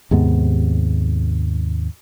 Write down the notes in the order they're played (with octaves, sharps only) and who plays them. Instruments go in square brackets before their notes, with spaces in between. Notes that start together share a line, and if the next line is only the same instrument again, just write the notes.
[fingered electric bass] D#2 G#2 C3 B3